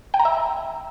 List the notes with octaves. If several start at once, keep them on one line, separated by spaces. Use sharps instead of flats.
G5
A#5
E5